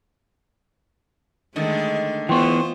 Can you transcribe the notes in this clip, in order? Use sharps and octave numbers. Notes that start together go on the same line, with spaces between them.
D3 D#3 G#3 A3
E3 B3 F4 C5 G5 C6 C#6